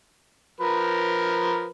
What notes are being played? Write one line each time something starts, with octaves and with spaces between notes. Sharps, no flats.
F3 A#4 B4